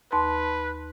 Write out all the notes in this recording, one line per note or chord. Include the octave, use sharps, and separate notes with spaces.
D#2 B4 A5 C6